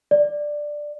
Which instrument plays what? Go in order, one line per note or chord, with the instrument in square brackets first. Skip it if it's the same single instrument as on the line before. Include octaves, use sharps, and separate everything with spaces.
[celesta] D5